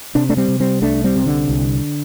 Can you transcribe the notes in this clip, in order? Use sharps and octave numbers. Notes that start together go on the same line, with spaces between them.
C3 D4
A3 D4
G3 C4
C3
G3 C4
C2 A3 D4
G3 C4
C3
D3
C2